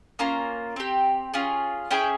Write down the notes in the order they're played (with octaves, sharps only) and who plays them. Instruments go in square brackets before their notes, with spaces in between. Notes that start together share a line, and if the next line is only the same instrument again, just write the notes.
[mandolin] A#3 C#4 F4 A#5
C4 G4
C#4 F4 G#4
C#4 E4 G#4 G5